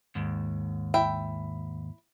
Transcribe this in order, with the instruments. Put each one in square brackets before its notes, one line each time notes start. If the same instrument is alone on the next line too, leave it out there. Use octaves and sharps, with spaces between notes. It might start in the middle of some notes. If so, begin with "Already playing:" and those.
[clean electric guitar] D#2 G#2
[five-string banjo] E4 G5